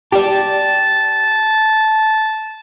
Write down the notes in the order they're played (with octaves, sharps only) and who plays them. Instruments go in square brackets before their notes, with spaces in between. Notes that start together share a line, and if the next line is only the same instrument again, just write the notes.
[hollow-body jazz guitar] G4 D5 [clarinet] A5